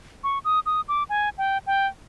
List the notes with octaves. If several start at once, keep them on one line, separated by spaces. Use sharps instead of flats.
C#6
D#6
D#6
D6
G#5
G5
G5